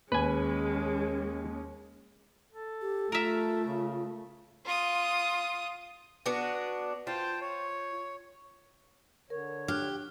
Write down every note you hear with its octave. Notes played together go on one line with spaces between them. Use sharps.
D#2 G#3 C#4 B4 G#5
A4
G4
A3 F4 A#4 E5
C#3
F4 D#6
B3 D4 F#4
F4 C5 G5 A5
C#5
D3 A#4 C#5
D4 G4 F6 F#6